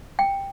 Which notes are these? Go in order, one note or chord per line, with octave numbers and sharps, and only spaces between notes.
G5